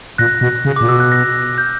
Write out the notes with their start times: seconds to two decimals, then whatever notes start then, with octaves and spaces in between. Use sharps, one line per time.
0.18 A#2 F#6 A#6
0.41 B2
0.65 C#3
0.76 A#2 D6
0.88 B2 E6
1.00 F#6
1.12 F#6 A#6
1.58 G6